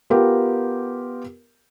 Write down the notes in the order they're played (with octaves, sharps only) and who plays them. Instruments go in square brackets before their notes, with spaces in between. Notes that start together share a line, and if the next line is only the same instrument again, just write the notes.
[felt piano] B3 F4 G4 A#4